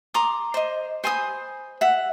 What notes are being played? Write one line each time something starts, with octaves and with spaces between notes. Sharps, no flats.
A#5 C6 D6 D#6
C5 D#5
C5 G#5 B5 D#6
E5 F#5